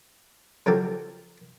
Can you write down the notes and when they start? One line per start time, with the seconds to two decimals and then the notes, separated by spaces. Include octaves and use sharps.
0.66 C#3 F3 F#3 G4 A4